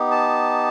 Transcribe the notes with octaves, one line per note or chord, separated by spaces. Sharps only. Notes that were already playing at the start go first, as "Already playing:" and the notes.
Already playing: B3 D#4 G4
A5